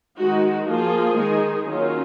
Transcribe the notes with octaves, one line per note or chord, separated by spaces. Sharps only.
D#3 G#3 D#4 F#4
F3 A#3 F4 G#4
D#3 G#3 D#4
D#3 F#3 A#3 C#4 F4